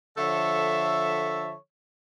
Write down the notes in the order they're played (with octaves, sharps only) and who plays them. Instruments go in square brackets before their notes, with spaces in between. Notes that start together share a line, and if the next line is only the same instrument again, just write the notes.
[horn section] D3 F3 A4 C#5 E5